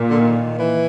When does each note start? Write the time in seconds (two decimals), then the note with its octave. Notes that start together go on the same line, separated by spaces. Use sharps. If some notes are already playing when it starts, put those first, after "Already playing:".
Already playing: A#2
0.10 D3
0.20 D#3
0.59 E3